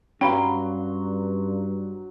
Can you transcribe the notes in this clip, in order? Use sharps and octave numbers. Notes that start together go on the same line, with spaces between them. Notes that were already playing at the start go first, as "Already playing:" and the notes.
G2 F#3 C#4 F5 G5 B5 C6